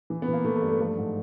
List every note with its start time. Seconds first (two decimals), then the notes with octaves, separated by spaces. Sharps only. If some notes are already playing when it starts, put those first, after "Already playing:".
0.10 E3
0.22 B3
0.28 E3
0.33 A#3
0.44 E3 A3
0.56 A3
0.62 G2
0.69 A3
0.80 F3 A3
0.97 G#2